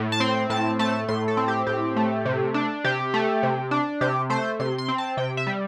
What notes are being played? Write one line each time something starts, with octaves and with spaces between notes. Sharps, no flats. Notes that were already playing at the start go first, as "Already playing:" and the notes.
Already playing: A2
A5
C4 C6
A2 A5
A3 A5
A2 C6
A4
C4
G4
A2 G4
A3
C3
D4
C3 G4
A3
C3
D4
C3 G4
A3 C5
C3 C6
C6
C4
A5
C3 G5
E5
G3